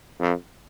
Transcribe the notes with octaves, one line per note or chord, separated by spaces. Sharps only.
F2